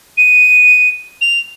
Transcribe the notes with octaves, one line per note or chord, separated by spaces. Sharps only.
D#7
F7